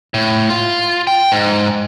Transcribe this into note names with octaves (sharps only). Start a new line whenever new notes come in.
A2
F4
G5
G#2